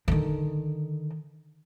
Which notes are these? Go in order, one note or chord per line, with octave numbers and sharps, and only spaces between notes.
D3 D#3